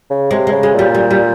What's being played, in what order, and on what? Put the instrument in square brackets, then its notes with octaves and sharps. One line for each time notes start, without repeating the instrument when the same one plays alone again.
[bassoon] C#3
[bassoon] C3 [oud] G#3
[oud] G#3
[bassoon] C#3
[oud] G#3
[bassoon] A#2 [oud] G3
[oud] G3
G3